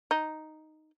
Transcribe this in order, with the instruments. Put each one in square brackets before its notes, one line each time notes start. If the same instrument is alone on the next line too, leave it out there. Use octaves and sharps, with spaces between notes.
[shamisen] D#4